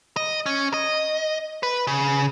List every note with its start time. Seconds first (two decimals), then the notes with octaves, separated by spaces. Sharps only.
0.17 D#5
0.46 C#4
0.74 D#5
1.63 B4
1.87 C#3